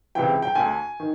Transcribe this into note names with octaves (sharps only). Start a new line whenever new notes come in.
C#2 C3 E3 G5
G5
D2 D3 G#5
D#3